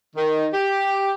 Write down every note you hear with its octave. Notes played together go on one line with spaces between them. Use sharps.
D#3
G4